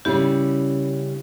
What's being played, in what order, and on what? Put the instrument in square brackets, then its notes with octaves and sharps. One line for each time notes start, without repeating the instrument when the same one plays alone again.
[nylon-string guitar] C#3 G3 C#4 E4 [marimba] G4